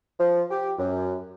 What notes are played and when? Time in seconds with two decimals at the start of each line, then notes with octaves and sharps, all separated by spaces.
0.20 F3
0.51 G4
0.78 F#2